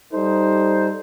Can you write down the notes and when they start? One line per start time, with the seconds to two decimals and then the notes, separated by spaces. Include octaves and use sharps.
0.12 G3 D#4 A4 C5